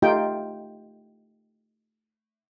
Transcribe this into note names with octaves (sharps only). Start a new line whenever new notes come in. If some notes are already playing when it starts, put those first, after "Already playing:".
A3 D#4 F4 G4 G5